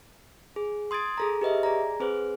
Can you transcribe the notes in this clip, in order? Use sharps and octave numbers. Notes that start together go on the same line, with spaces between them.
G#4
C6 D#6 G#6 A6 D7
G#4 A4 A#5
G4 B4 D#5 E5
G#4 D5 A#5
C4 G#4 B4 C5